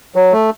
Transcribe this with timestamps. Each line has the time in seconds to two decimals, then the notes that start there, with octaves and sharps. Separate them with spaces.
0.16 F#3
0.32 A3